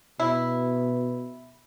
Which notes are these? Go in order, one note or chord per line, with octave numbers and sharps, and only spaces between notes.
B2 E4